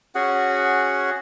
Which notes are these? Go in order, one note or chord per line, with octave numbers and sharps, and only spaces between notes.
C#4 F#4 G#4 F#5